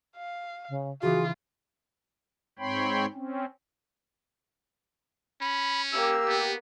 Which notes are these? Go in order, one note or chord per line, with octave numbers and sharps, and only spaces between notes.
F5
C#3
C#3 E3 F4 F#4 G#4
G#2 C4 C#5 G5 B5 C6
C4 C#4
C#4 B5
A#3 G4 E6
B3